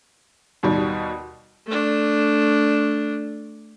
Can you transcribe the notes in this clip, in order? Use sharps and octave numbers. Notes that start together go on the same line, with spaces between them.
D#2 B2 G3
A3 D4